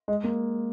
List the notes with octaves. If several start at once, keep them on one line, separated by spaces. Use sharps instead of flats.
G#3
A#3